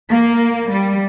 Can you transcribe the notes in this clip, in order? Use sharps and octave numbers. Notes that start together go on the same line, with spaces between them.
A#3
G3